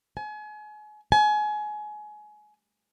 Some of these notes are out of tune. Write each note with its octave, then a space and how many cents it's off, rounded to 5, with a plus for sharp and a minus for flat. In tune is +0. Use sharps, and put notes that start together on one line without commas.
G#5 +35
G#5 +25